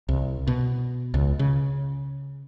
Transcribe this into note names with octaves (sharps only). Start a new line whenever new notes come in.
C2
B2
C#2
C#3